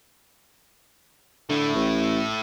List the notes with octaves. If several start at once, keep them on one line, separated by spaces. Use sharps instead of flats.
D3 A3 E4
A1